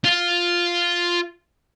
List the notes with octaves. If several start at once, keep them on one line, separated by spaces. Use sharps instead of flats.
F4